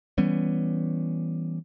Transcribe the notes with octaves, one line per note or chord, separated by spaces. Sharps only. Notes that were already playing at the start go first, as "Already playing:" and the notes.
E3 G3 B3 C#4